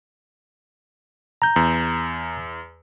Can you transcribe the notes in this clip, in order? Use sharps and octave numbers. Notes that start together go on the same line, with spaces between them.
A#5 G6
E2